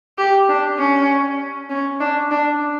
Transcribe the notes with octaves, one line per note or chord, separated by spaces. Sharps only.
G4
D4
C#4
C#4
D4
D4